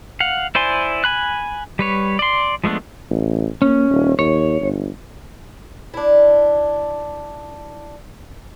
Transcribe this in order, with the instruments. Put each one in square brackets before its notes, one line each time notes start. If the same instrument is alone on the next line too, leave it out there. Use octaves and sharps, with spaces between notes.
[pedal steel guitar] F5 F#5
E4 C5 D5 G#5 C6
G#5 B5 F#6
G3 B4 C#5
D5 C6
F3 G#3 A3 B3 D4
[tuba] A1
[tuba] A#3 [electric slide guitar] C#4
[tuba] D#1
[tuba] D#2 [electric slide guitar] C#5
[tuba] G1
[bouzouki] D4 E4